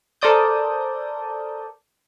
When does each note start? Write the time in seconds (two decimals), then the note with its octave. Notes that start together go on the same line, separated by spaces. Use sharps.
0.21 A4 A#4 C5 D5 D#6 G6